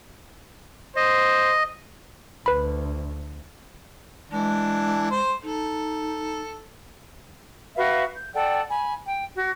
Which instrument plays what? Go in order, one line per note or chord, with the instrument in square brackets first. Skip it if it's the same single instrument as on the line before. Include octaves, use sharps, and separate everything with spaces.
[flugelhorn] C5 [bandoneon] D#5
[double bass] D2 [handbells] B4 B5
[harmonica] E3 D4 [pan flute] G#3
[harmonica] C5 C6
[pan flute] D#4 [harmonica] A4
[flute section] F#4 B4 E5 F5
G6
A4 D5 F#5 G5
G#5 B5
G5
F#4